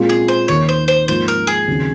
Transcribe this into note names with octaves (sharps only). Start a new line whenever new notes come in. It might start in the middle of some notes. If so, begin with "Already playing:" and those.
Already playing: A#2 G#3 C4 F4
G#4
C5
D#2 D#3 A#3 D#4 C#5
C5
C5
G#2 F3 A#3 F4 C5
A#4
G#4
D#2 C#3 F#3 C4